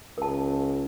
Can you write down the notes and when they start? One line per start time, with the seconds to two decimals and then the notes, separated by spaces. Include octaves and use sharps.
0.18 C#2 A#4 A5